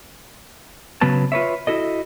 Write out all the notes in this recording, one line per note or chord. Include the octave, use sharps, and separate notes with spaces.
C#3 F#3 B3 B4 A5
F4 B4 C#5 E5
E4 F#4 A4 D#5